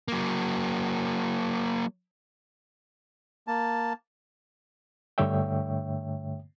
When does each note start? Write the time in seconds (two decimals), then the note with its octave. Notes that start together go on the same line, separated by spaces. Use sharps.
0.08 F#3 A#3
3.47 A#3 A5
5.18 G2 D3 A3 C#5 E5 G5